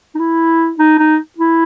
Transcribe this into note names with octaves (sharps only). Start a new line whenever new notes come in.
D#4
E4
D#4
D#4
E4